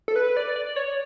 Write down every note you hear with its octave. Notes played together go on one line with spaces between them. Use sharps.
A4
B4
D5
D5
C#5